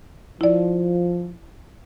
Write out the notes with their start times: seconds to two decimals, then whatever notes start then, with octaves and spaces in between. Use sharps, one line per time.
0.41 F3 E4 D5